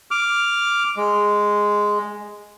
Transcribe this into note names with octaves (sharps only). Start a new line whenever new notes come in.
D6 F6
G#3